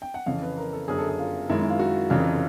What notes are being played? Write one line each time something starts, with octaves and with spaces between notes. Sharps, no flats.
G5
F#5
F2 C#3 E3 F5
B4
A#4
A4
G1 F#2 D3 G#4
A4
G#4
F4
F#2 D#3 G#3 E4
E4
F4
F#4
F1 F2 C#3 E3 F4